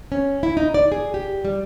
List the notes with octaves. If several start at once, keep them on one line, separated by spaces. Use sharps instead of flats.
C#4
E4
D#4
D5
G#4
G4
G3